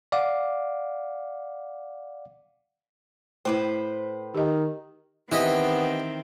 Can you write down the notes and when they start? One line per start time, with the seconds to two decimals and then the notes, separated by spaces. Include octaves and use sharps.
0.12 D5 F5 F#5 D6
3.45 A2 A3 E4 B4 C5
4.35 D#3 G4 D#5
5.32 D#3 E3 B3 C4 G4 D#5